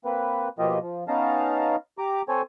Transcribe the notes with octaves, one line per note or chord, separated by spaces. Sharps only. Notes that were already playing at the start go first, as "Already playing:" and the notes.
A#3 C4 B4
B2 F3 A#3 F4 G4 D#5
F3
B3 C#4 D#4 F5 A5 A#5
G4 A#5 D6
C4 A4 C5 C#5 G#5